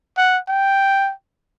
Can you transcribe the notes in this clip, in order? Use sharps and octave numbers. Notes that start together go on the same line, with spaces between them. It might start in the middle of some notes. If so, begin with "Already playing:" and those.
F#5
G5